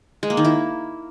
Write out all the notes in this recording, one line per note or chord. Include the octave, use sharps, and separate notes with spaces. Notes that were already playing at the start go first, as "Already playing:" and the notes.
G#3
A#3
D#3
E4